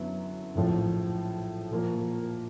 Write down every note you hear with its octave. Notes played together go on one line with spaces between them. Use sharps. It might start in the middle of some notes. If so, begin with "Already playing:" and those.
Already playing: F#2 D3 F#3 B3 E4
A#1 A2 F3
A#2 F3 A#3